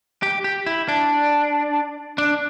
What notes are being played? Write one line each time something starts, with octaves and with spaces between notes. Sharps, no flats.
G4
G4
E4
D4
D4